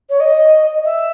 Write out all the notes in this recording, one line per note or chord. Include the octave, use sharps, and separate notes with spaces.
C#5
D#5
E5